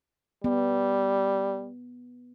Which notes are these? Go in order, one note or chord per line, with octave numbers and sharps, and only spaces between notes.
G3 B3